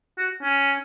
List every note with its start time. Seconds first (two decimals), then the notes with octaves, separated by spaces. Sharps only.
0.18 F#4
0.43 C#4